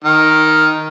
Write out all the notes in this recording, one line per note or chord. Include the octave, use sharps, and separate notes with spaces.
D#3